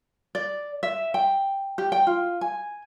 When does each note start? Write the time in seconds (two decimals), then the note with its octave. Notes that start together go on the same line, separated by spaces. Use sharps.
0.35 D5
0.83 E5
1.14 G5
1.78 G4
1.92 G5
2.07 F4
2.41 G#5